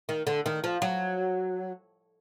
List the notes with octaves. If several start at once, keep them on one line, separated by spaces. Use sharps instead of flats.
D#3
D3
D#3
F3
F#3